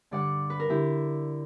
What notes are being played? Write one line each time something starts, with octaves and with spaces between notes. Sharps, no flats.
G2 D3 D5 F#5
B4
A#4
D3 E4 G4